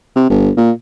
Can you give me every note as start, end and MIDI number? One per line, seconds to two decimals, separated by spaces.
0.16 0.28 48
0.30 0.51 31
0.57 0.71 46